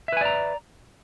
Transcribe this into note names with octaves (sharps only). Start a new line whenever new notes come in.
B4 D5 E5 G#5 A#5